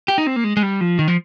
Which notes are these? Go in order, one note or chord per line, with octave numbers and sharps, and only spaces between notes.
G4
D#4
C4
A#3
G#3
G#3
G3
F3
D#3
F3